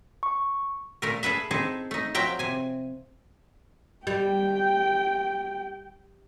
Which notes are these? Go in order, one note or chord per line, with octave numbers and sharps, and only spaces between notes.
C#6
A#2 A3 A#4
G#4 A4 B4 E5
C4 D#4 E4 G#4 A4
A3 D#4
F3 F#3 E5 G5 A#5
C3 G#5
G3 G5